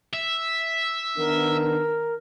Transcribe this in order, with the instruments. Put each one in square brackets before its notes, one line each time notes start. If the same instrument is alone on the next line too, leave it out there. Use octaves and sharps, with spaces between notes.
[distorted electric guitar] E5
[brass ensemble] D#3 B3 D4 [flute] A#4